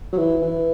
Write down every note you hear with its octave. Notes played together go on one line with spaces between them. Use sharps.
F#3
E3
E3